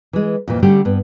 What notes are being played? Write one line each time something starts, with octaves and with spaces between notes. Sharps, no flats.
E3 G#3
F2 A#2 E3
D3 G3 A3 C#4 G4
G2 B3